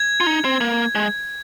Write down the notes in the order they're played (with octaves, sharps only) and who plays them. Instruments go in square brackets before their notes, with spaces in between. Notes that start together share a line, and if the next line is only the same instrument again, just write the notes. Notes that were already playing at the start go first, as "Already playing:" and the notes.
Already playing: [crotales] G#6
[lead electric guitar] F4
D#4
C4
A#3
G#3